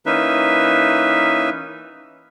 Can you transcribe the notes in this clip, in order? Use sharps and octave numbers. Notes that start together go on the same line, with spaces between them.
E3 A#3 C#4 D#4 B4 E5